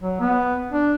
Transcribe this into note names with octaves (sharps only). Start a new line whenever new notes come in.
F#3
B3
D4